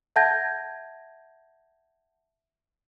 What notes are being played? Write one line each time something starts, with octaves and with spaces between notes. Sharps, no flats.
E5 F#5 A5 G6 G#6 A#6